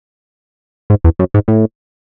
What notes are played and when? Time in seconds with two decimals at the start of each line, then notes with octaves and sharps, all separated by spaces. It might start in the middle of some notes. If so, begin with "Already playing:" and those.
0.90 G#2
1.04 E2
1.19 F#2
1.34 G#2
1.48 A2